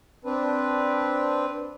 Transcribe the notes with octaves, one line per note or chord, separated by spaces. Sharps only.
C4 D4 B4